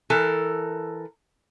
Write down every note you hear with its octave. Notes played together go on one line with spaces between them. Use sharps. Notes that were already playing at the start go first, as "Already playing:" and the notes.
E3 A4 A#4